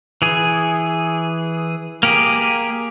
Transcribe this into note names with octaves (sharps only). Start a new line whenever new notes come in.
E3 G#4
A#3 G4 G#4